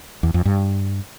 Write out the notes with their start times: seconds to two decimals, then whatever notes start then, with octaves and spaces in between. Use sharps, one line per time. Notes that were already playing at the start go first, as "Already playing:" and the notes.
0.23 E2
0.34 F2
0.45 G2